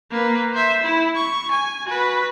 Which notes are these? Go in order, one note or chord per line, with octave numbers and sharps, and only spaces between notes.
A#3 B4
C5 E5
E4
C#6
G#5
F#4 B4